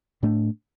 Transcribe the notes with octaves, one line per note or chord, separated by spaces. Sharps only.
A2 A3 D4